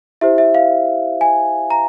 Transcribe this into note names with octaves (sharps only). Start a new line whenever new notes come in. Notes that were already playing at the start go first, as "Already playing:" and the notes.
E4 G4 C5 E5
E5
F5
G#5
A#5